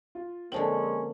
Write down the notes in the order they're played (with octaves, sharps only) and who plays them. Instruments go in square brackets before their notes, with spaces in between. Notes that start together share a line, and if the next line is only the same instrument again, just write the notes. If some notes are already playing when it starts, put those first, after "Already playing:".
[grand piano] F4
[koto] D3 F3 C4 [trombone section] G#3 C#4 [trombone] A#3 [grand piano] F#7